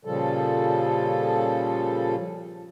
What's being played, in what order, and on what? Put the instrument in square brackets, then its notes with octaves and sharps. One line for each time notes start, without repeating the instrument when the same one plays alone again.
[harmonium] A#2 C#3 F3 G3 A4